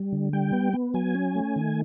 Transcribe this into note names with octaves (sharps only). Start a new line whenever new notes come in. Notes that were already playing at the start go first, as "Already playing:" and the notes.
Already playing: G3
D3
G3 G5
B3
B3
F#3 G#5
C#4
A3
D#3